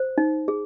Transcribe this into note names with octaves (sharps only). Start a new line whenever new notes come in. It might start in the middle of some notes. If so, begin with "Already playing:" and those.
Already playing: C5
D#4
G#4